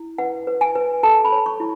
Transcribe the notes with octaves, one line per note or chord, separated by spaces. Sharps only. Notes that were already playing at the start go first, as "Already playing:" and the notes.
Already playing: E4
B4 F#5
B4
G#5
B4
A4 A5
B5
C#5
C#6
E4